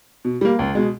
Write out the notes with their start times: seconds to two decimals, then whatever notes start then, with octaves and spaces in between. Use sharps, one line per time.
0.25 B2
0.41 G3 A#3
0.59 C#2
0.75 B2 G#3